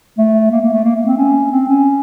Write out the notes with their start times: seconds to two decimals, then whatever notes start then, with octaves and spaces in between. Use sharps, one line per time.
0.18 A3
0.51 A#3
0.61 A#3
0.73 A3
0.84 A#3
0.95 A#3
1.06 C4
1.17 C#4
1.52 C4
1.69 C#4